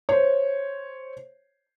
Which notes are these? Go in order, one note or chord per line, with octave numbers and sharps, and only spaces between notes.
C5 C#5